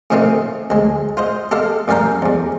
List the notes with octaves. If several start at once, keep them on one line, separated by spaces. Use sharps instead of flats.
A2 C3 D#3 A3 C4 F4
D2 G#3
F4 C5 D#5
G4 A4 D#5 F5
A1 F#2 G3 F5 G5 A#5
E2 G2